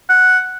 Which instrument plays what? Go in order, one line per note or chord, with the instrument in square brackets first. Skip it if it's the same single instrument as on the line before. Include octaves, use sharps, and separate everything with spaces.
[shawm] F#5